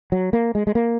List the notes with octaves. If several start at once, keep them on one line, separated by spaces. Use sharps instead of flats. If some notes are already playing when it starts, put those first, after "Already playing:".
F#3
A#3
G#3
G#3
A#3